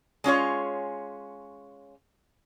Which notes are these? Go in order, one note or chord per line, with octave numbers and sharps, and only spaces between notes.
G#3 C#4 F4 C#5